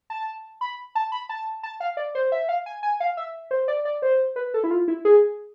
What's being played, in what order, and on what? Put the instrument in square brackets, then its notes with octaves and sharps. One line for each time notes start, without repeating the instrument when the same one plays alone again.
[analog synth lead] A5
B5
A5
B5
A5
A5
F5
D5
C5
E5
F5
G#5
G#5
F5
E5
C5
D5
D5
C5
B4
A4
E4
F4
E4
G#4